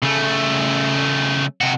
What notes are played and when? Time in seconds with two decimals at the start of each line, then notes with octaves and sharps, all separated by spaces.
0.03 C#3 A3
1.61 C3 F#4